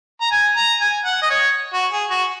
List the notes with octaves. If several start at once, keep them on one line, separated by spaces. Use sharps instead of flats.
A#5
G#5
A#5
G#5
F#5
D#5
C#5
F#4
G#4
F#4